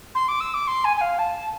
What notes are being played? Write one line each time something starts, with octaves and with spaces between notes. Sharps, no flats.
C6
D6
E6
D6
C6
G#5
G#5
F5
A5